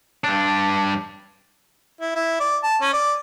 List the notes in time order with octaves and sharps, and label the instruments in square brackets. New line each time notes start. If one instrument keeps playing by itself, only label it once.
[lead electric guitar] G2 D4
[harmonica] E4
E4
D5
A5
C#4
D5